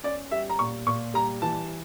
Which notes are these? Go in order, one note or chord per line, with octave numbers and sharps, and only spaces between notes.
C#4 D5
G3 E5
A#5
A#2 C#6
A#2 C#6
G3 A#5
E3 A5